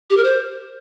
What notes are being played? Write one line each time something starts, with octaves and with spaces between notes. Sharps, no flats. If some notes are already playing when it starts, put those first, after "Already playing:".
G4
A#4
C5